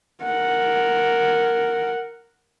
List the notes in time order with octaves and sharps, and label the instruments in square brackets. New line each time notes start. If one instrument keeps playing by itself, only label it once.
[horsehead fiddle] A#4 F#5